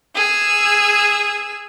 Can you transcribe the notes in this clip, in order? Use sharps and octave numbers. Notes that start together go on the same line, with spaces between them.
G#4 E6